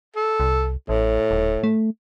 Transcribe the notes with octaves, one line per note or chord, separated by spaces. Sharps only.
A4
C2
A1 A2
D#1
A3